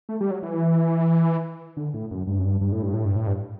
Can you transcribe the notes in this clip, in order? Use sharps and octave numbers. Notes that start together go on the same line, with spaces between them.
A3
G3
F#3
E3
D3
A2
F#2
G2
F#2
G2
G2
A2
G2
A2
G2
A2
G2